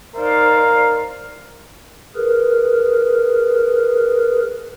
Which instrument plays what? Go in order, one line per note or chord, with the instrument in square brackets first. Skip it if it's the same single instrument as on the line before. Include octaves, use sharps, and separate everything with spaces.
[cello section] D#4 C5 D5 [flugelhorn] A#4 [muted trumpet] F5
[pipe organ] G#4 A#4 B4